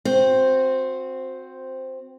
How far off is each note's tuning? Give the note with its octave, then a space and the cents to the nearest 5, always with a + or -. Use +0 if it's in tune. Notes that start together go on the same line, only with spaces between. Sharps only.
C4 +0 F#4 -20 C5 +0